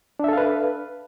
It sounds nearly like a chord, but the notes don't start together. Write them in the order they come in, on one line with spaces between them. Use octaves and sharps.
D4 E5 A4 F5 B4